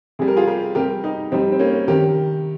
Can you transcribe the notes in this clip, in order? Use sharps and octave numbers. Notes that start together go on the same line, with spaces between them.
C3 G3 G#4
A#4
F4 G#4
G4 A#4
C3 G3 G4 A#4
D#4 G4
C3 G3 C4 D#4
C4
A#3 C#4
C3 D#3 G4 A#4